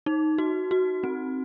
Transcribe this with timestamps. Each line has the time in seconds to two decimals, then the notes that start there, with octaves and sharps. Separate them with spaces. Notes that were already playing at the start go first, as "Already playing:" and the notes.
0.06 D#4
0.38 F#4
0.71 F#4
1.04 C4